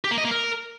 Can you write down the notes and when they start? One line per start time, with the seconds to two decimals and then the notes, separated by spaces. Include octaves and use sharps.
0.04 G4
0.11 A#3
0.18 D#5
0.25 A#3
0.31 A#4